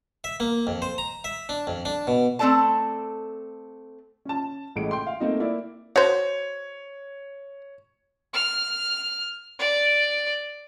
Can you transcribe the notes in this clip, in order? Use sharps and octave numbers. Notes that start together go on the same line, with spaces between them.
E5
A#3
F2
C5
A#5
E5
D4
F2
D4
B2
A3 C4 F4 A4 D5 A5
C#4 A5
A1 A2 G#3 D7
G5 C6
F5
A3 A#3 C4 D#4
A#3 E4 D5
F#4 C5 C#5
F6
D5